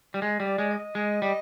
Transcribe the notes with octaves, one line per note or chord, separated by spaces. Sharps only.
G3
G#3
G3
D5
G#3
D#5
G#3
G3